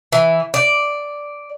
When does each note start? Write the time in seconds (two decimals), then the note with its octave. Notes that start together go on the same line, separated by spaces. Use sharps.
0.12 E3
0.54 D5